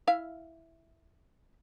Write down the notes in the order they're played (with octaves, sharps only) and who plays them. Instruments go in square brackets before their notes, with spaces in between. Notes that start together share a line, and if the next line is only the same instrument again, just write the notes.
[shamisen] E4 E5 F5